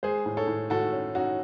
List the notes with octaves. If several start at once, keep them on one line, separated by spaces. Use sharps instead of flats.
G#3 G#4 C5
A2
A4 C#5
A2
A2 F#4 A4
C#4
C#4 D#4 F#4